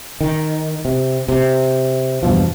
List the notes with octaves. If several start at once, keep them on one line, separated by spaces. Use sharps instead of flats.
D#3
C3
C3
E2 G2 B2 F3